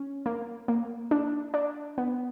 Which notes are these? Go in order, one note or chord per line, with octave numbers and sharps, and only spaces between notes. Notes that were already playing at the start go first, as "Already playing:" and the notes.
Already playing: C#4
A#3
A#3
D4
D4
B3